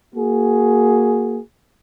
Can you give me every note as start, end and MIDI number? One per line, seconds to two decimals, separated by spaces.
0.15 1.39 58
0.15 1.39 66
0.15 1.39 68